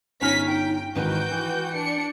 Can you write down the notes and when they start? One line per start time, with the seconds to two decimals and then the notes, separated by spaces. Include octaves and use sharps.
0.21 G1 C#4 D#4 F6 A#6 B6
0.51 G5
0.96 G#1 D#3 E3 F#4 B4 G5 G6
1.32 E3
1.73 D4 C#7